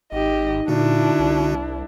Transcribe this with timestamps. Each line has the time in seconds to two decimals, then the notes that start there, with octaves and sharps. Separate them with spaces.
0.12 G#1 D#4 G4 D#5
0.68 A#2 D3 D4 E4 F#4
1.19 C2